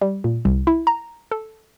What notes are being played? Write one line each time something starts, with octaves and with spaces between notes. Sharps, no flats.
G3
A#2
C2
E4
A#5
A4